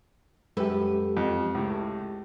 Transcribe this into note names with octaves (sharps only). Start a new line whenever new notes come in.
F#2 G#3 G4 A4 B4
F2
C#2 A2